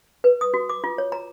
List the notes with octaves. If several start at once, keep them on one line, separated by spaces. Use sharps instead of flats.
B4
D#6
F#4
D6
F4
C#5
A#5